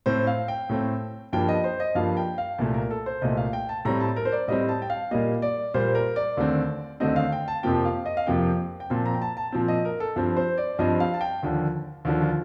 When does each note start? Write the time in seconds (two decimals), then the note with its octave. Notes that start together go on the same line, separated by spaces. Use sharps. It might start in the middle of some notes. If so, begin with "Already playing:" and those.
0.06 A2 A3 C4 C5
0.27 F5
0.48 G5
0.69 A2 A3 C4
1.33 G2 F3 A#3 G5
1.49 D#5
1.64 C5
1.80 D#5
1.95 G2 F3 A#3 F5
2.17 G5
2.38 F5
2.58 C2 A#2 A3
2.74 A#4
2.91 A4
3.06 C5
3.22 C2 A#2 A3 D#5
3.37 F5
3.53 G5
3.69 A5
3.85 A2 G3 C4 A#5
4.00 A5
4.16 A#4
4.25 C5
4.32 D5
4.48 A2 G3 C4 D#5
4.69 A5
4.82 G5
4.90 F5
5.11 A#2 G3 A#3 D#5
5.42 D5
5.74 A#2 G3 A#3 C5
5.95 A#4
6.16 D5
6.37 D#2 D3 A3 C4
7.00 D#2 D3 A3 C4 D#5
7.16 F5
7.32 G5
7.48 A5
7.63 F2 C3 F3 A#3 G5
7.85 F5
8.06 D#5
8.17 F5
8.27 F2 C3 F3 A#3 G5
8.80 G5
8.90 A#2 F3 C4 A5
9.06 A#5
9.14 G5
9.22 A5
9.37 A5
9.52 A#2 F3 C4
9.68 D#5
9.85 A#4
10.00 A4
10.16 G2 F3 C4
10.37 C5
10.58 D5
10.79 G2 F3 C4 D#5
11.00 F5
11.14 A5
11.21 G5
11.43 D#2 D3 F3
12.05 D#2 D3 F3
12.21 F4